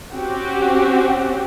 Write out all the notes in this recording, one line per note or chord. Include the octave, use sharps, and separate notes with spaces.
C4 C#4 F#4 G4